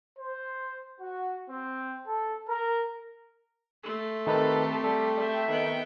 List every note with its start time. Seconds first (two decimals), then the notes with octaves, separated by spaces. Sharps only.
0.19 C5
1.00 F#4
1.50 C4
2.07 A4
2.48 A#4
3.83 A3 C6
4.27 D#3 C4 D#4 G4 A4 B4
4.84 G3 A4
5.20 E5 G5
5.50 D#3 B3 G5